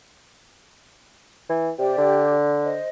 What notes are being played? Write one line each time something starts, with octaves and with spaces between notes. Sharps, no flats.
E3
C3 G4 D5 G5
D3
C5 D#5